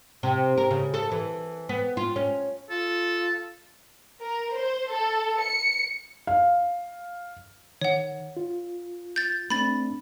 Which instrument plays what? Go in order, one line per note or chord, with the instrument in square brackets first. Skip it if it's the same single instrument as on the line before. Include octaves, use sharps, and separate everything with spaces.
[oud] C3
A#4
C#3
A4
E3
B3
F4
C#4
[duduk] F4 [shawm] A4
[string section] A#4
C5
A4
C#7
[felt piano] F5
[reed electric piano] D#3 [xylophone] C#5 F#5
[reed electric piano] F4
[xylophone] G6 A6
[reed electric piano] A3 C4 D4 [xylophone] B5 A6